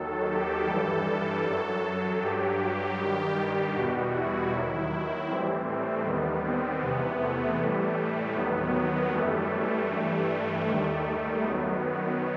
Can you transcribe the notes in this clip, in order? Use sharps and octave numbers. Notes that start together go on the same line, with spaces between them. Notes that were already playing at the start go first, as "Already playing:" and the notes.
Already playing: D#2 D#3 F#3 A4
G4
G2 E3 G3 A4
F#2 F#3
G2 F#3 G4
G2 D#3 G3
E2 B2 G3 F#4
E4
D#2 D#3 F#3
A2 E3 G3 C4
A3
D#2 D#3 G3 B3
C4
E2 C3 E3 B3
A3
A2 E3 G3
D#2 D#3 F#3 B3
B3
F#2 E3 G3 A3
A3
G2 E3 G3
D#2 D#3 G3
F#2 D#3 F#3 B3
B3